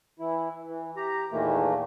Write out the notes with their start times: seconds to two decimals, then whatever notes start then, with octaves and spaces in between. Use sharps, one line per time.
0.19 E3 E4
0.67 E3
0.96 G4 A#5
1.32 E2 A#2 D#3 E3 A3 A#3